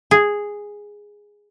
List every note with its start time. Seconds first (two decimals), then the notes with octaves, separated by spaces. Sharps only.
0.11 G#4